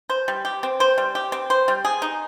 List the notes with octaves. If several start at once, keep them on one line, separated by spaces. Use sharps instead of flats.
C5
G3
G4
C4
C5
G3
G4
C4
C5
G3
G#4
D#4